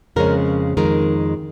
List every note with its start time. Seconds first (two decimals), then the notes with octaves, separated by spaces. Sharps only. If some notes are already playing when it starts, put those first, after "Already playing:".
0.16 F2 C#3 G#3 C#4 A#4
0.77 F2 D#3 G#3 A#4